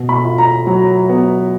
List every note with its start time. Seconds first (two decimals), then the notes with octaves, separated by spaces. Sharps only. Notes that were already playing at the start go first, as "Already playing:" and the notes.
Already playing: B2
0.09 B5
0.24 F4
0.38 A#5
0.67 F#3
1.09 B3